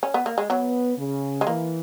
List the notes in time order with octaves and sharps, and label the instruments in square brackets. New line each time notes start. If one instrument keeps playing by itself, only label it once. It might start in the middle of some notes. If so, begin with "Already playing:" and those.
[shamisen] C#4
B3
A#3
G#3
[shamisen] F#3 [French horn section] B3
[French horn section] C#3
[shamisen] G#3
[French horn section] E3 [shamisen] A#3